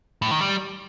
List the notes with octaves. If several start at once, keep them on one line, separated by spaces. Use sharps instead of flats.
A2
D#3
G3